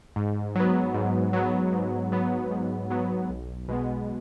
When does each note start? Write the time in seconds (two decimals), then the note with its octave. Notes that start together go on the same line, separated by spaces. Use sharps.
0.16 G#2
0.55 F#3 B3
0.94 G#2
1.33 F#3 B3
1.73 G#2
2.12 F#3 B3
2.51 G#2
2.90 F#3 B3
3.30 B1
3.68 B2 G#3 B3